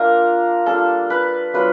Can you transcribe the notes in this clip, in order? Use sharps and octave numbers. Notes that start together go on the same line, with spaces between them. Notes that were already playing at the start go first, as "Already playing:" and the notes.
Already playing: A#3 D4 F4 A#4
G3 A#3 D4 F4 A4
B4
F#3 B3 D4 F4 B4